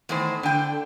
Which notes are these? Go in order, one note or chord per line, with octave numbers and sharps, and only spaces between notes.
E2 A2 D#3 C5
D3 G5